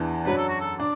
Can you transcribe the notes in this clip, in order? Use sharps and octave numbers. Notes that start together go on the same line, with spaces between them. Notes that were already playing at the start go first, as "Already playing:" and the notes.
Already playing: E2 E3 D4
F#2 F#3 D4 B4
A4
F#4
A4
D4 D5